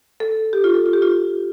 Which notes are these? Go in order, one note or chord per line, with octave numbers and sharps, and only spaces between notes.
A4
G4
F4
A4
F4
G4
F4